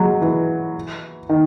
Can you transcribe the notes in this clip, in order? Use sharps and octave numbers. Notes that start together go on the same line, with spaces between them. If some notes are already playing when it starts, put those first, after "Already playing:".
Already playing: F#3 G#3
E3
D#3